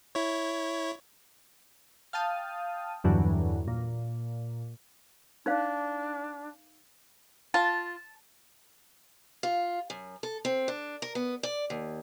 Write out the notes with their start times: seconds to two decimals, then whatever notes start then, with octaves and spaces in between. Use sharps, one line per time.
0.15 E4 C#5
2.13 F5 G5 A5 D#6
3.04 E2 G2 D3 E3 F#3
3.68 A#2
5.46 D4 D#4 C5 F5
7.54 F4 A5
9.43 F4
9.90 F#2
10.23 A4
10.45 C4
10.68 D4
11.02 A#4
11.15 B3
11.43 D5
11.70 D#2